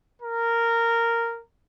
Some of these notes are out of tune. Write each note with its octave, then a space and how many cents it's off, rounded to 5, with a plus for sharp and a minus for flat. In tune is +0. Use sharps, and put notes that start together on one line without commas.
A#4 -10